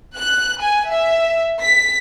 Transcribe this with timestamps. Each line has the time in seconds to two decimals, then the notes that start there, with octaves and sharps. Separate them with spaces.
0.15 F#6
0.61 G#5
0.91 E5
1.62 B6